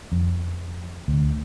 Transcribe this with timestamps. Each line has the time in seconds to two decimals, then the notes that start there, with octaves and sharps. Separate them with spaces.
0.12 F2
1.08 D2